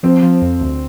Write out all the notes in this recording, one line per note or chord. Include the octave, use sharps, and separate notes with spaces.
F3 C4
F3
F2
D2